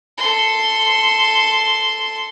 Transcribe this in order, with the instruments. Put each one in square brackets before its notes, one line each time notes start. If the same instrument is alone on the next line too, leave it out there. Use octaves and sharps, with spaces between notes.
[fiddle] A4 C6